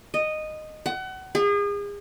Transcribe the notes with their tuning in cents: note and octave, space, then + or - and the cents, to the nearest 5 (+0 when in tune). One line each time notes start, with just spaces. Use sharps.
D#5 -10
F#5 +30
G#4 -35